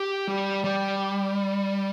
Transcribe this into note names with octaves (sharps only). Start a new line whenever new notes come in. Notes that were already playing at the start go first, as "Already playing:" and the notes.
Already playing: G4
G3
G3